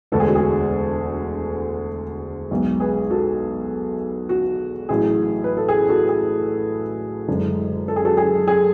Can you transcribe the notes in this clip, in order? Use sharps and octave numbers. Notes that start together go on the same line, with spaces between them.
E1 D2 D3 G#3 A4
G#4
F#4
G#4
B1 B2 G#3
G#4 B4
F#4 A4
F#4
A1 A2 F#3 G#4
B4
A4
G#4
F#4 A4
G#4
F#1 F#2 D3 G#3
A4
G#4
F#4 A4
G#4
G#4